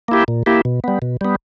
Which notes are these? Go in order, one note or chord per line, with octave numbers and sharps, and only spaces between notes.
A#3 E4 G4
A#2
A#3 E4 G4
B2
G3 B3
B2
G3 B3